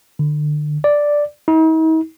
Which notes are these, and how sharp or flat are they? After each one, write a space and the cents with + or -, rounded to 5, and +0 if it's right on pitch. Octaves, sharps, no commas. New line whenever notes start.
D3 +30
D5 +0
D#4 +45